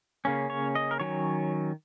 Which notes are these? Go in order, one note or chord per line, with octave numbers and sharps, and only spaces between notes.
C#3 A#3 C#4
C#5
D#5
A#4
D#3 F#3 C#4 C#5